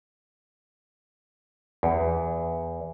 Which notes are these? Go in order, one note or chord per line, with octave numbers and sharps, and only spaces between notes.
E2